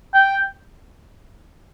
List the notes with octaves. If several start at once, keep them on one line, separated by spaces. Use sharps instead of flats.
G5